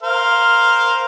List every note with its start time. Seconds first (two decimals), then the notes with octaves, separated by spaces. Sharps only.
0.03 A#4 C5 F5